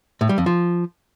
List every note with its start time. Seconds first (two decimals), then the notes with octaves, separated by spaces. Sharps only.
0.21 A2
0.29 G3
0.38 F2
0.46 F3